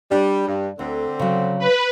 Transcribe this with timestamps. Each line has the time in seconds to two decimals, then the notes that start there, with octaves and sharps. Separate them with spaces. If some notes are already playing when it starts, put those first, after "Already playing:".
0.11 G3 D4
0.47 G2
0.79 D2 D3 C4
1.19 C#3 F#3
1.59 B4